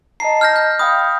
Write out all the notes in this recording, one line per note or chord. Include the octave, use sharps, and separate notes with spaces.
D#5 A5 A#5 C7
F6 G6 A#6
G6
F5 G5 B5 D#6